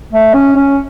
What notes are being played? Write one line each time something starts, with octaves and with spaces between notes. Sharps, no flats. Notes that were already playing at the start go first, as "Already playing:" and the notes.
A3
C#4
C#4